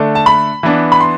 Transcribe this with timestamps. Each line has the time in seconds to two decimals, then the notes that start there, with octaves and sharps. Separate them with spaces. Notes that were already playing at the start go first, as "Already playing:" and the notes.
Already playing: D3 A3 D4
0.15 A5
0.26 B5
0.63 E3 B3 D4
0.92 B5
1.00 C6